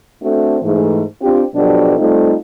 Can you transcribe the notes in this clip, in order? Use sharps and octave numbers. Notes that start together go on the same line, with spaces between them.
A3 C4 D4 F#4 A4
G#2 E3 A3
C4 D4 F4 G4
B2 F3 F#3 D4 G4 A4
G3 A3 C4 D#4 F4